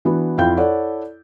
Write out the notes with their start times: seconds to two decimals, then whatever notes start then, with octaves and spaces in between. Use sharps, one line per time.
0.05 E3 B3 D4 F#4
0.38 F2 E4 F4 F5 G5 G6
0.57 E4 A4 C#5 D5 F#5